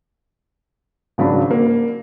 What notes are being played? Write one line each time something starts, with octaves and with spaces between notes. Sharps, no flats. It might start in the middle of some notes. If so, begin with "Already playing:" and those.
G#1 C#3 F#3 D4 B5
A#3